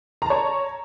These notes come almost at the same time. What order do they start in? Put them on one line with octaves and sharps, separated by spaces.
A#5 A5 C#5